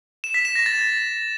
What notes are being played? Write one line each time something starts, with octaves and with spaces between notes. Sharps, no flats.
E7
B6
E7
A#6
A6